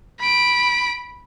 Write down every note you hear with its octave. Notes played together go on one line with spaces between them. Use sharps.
B5 D7